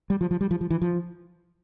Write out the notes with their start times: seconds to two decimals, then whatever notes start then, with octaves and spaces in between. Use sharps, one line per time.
0.10 G3
0.21 F3
0.31 F3
0.41 G3
0.51 F3
0.61 F3
0.70 E3
0.81 F3